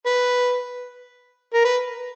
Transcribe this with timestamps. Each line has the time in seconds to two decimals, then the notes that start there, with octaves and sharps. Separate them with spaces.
0.06 B4
1.54 A#4
1.65 B4